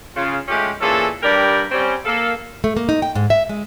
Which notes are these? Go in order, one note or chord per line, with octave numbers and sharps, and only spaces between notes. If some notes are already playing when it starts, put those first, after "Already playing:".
C#3 F4
G#3 A3 C#4 F4 G4
A#2 E3 C#4 G#4 A4
G2 G4 A#4 D5 G5 B5
G3 C4 C#4
A#3 A4 F5
A3
A#3
D#4
G5
G#2
E5
G#3